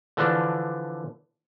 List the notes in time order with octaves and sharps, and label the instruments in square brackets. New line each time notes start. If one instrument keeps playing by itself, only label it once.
[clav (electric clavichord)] D3 E3 F3 D4